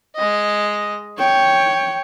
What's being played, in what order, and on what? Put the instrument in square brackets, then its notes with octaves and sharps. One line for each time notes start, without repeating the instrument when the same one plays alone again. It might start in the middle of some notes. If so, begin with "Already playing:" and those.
[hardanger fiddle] G#3 D#5
[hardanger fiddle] C#5 [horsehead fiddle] G5